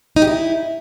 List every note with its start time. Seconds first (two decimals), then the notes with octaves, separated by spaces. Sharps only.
0.16 D#4
0.22 G4
0.27 E4